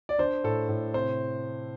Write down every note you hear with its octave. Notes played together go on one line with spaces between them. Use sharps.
D5
D4 C5
A2 A4
A2
C3 C5